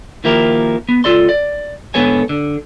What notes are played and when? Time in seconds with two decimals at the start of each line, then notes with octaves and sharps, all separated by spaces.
0.24 D#3 F3 A#3 E4 G4 A#4
0.89 B3
1.04 C#2 F3 F4 A4 D5 C6
1.29 D5
1.94 G#2 D3 B3 A4 C#5 G#5
2.29 D3